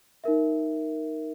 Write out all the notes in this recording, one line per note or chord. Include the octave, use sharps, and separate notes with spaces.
D#4 A#4 E5